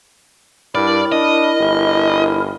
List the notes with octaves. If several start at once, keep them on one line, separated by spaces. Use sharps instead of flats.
G2 E4 A#4 D5
D4 D#5
G1